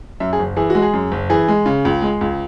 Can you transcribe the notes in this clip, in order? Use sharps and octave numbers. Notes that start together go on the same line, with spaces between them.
F#2 E5
G#4
F#1
E3 G#4
F#4
G#3
G#4
F#2
F#1
E3 G#4
G#3
C#3
C#2
G#3
C#2